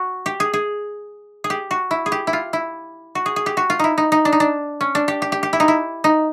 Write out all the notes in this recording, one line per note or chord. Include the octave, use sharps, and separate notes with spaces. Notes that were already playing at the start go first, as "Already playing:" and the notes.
Already playing: F#4
G4
G#4
G#4
G#4
G4
F#4
E4
G#4
G4
E4
F4
E4
F#4
G#4
G#4
G4
F#4
F4
D#4 E4
D#4
D#4
D4
D#4
D4
C#4
D4
G4
G4
G4
G4
E4
D#4
E4
D#4